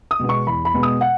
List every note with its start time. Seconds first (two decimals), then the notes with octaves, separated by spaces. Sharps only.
0.11 D#6
0.19 B2 G#3 B3
0.29 C#6
0.47 E2 B5
0.65 B5
0.74 B2 G#3 B3
0.83 D#6
1.01 F#5